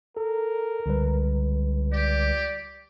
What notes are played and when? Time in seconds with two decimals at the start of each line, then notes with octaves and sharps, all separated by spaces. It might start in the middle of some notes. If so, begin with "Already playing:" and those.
0.17 A4 A#4
0.86 C#2 D3 G3 B4
1.93 G4 D5